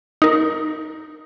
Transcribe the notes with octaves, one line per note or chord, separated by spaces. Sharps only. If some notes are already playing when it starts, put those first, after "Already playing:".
D#4 A#4